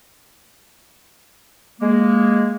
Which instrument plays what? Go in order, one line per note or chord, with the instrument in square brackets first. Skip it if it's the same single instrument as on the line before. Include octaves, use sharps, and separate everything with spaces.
[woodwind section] G#3 A#3